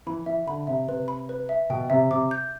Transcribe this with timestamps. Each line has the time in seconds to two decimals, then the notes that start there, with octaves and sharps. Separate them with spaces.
0.07 E3 B5
0.26 E3 E5
0.47 D3 B5
0.67 C3 E5
0.88 C3 B4
1.08 B5
1.29 B4
1.49 E5
1.70 B2 G5
1.90 C3 E5
2.11 C3 D6
2.31 G6